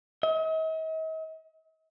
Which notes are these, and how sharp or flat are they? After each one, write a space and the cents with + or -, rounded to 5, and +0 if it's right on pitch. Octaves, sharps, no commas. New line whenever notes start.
D#5 +45